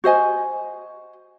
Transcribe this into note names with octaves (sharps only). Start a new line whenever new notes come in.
F#4 C5 D#5 G#5